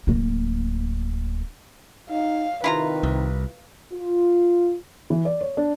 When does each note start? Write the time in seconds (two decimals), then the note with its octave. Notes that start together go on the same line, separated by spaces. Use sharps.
0.07 D1 A#3
2.09 D#4 F5
2.64 C3 D#3 E4 F4 B4 A#5
3.03 C2
3.92 F4
5.10 E3
5.25 D5
5.41 C#5
5.57 D4